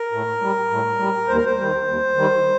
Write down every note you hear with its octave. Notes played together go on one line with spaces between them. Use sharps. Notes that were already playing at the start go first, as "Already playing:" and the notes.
Already playing: A#4
A2
G3
A2
G3
D#2 C5
A#4
C5
D#3 G3
D#2
D#3 G3